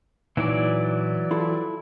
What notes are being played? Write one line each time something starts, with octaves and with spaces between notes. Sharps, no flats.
A#2 E3 F#3 D#4 E4 D5
E4 F4 A4